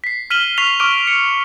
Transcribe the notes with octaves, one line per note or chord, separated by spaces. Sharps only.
B6 C7
F6 B6 D#7 E7 F#7 G7
C#6 F6 B6 C7 F7
C#6 D6 F6 D7 D#7 G7
C#7